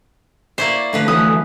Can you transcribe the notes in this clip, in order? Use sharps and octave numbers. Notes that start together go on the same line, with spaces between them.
A#3 E4 C5 D5 C#6
D3 F3 A3 B4
F#2 E3 C#4 D#6 F#6